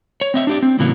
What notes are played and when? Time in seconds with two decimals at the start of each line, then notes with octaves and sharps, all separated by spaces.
0.21 C#5
0.34 C4 D#5 E5
0.47 D4 G4 D5
0.62 C4
0.79 A2 C#3 E3 F#3 A#3 B3